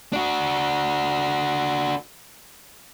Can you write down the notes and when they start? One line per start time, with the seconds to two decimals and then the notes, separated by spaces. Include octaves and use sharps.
0.13 D4 F#4